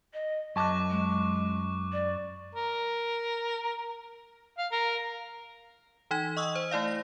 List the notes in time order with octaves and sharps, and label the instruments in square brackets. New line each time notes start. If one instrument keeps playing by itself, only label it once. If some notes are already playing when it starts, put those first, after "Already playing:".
[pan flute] D#5
[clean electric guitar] F#2 A5 [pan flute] D#5 [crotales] C#6 D6 F#6
[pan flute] G#3
D5
[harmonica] A#4
F5
A#4
[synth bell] E3 D#4 G#6
D#5 C#6 D#6 E6
C5
A3 E4 D5 F5
A#6